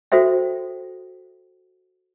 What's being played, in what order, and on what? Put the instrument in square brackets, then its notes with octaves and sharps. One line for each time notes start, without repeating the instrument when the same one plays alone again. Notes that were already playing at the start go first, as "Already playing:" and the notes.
[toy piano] F#4 A4 C5 E5 G5